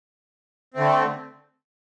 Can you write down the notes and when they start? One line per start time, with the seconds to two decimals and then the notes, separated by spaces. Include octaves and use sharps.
0.74 D3 A3 C4